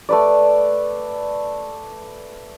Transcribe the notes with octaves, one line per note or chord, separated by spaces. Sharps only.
A3 B4 D5